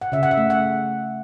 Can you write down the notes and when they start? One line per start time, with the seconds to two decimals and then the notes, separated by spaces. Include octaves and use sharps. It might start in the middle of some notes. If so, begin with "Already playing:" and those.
0.02 F#5
0.12 C#3 E5
0.23 F#5
0.31 E5
0.37 A3
0.50 F#5